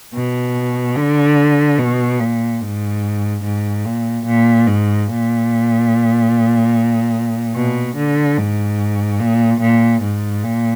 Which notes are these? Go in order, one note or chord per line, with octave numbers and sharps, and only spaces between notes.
B2
D3
B2
A#2
G#2
G#2
A#2
A#2
G#2
A#2
B2
D3
G#2
A#2
A#2
G#2
A#2